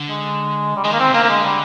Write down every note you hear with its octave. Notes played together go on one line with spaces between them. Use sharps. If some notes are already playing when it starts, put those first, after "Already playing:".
Already playing: D3
G#3
G3
D#3 G#3
A#3
C4
C3
D3 A#3
A#3
G#3
G3